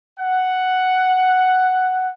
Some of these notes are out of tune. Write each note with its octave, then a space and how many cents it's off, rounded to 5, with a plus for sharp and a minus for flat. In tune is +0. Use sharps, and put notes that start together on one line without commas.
F#5 +5